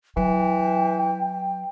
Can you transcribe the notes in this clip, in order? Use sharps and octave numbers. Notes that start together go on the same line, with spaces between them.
E3 F#3 G5